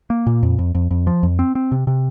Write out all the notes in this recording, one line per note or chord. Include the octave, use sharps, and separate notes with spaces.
A#3
A#2
F2
F2
F2
F2
F3
F2
C4
C4
C3
C3